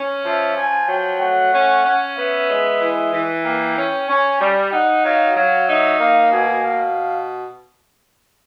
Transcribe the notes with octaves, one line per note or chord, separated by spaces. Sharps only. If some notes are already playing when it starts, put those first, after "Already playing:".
Already playing: C#4
F3 E5
F3 G#5
F#3 G5
A3 F#5
C#4
C#4
B3 E5
G#3
E3
E3
A#3 G5
C#4
C#4 G#5
G3 G5
D#4 F#5
F#3 F5
F#3 F5
D#4 E5
A#3 F5
B2 G#5
B2 F5